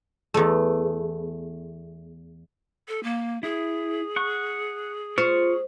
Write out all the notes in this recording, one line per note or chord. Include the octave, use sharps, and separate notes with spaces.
E2 A3
A4
A#3
E4 G#4
F#5 C#6
F4 C5 C#6 F6